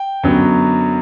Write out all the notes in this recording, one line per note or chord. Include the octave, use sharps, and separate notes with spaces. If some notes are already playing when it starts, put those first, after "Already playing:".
Already playing: G5
F#2 D3 F#3 B3